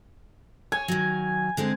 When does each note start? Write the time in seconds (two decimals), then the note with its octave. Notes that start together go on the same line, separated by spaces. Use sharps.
0.72 C#5 G#5
0.88 D#3 F#3
1.57 D3 G#3 C4